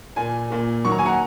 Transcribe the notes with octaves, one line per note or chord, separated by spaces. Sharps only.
A#2 A#3 G#5
A#2 A#3
D#3 F#3 A#3 C#6
A#5
G#5
F#5 A#5